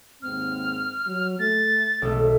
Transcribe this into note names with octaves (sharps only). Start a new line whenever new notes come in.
D#2 G#2 C4 F6
F#3
A3 A6
B1 D#3 G#3 A3 C#5